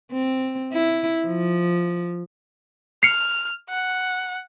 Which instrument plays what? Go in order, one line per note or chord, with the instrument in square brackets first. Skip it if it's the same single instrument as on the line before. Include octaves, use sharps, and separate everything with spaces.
[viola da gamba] C4
E4
F3
[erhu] F6 [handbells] C7 C#7
[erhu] F#5